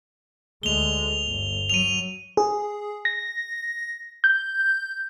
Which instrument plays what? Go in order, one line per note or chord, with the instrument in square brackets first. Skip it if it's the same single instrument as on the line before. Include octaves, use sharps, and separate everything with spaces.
[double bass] D2 G#3 [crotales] F7 G7
[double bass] G1
[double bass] F#3 [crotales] D#7 F7
[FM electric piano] G#4
A#6
G6